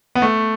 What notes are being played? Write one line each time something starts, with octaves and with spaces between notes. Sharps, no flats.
B3
A3